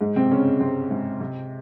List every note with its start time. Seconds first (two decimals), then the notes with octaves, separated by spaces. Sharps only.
0.01 G#2 G#3
0.16 C3 C4
0.31 C#3 C#4
0.60 C3 C4
0.90 G#2 G#3
1.20 C3 C4